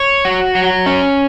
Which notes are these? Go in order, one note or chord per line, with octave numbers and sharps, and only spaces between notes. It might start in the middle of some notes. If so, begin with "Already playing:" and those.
Already playing: C#5
F#4
F#3
C#4